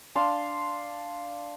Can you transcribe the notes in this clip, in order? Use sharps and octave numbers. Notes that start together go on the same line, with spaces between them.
D4 F5 A5 C6